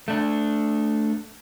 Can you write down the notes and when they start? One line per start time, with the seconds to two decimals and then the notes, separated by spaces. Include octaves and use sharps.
0.08 A3 D4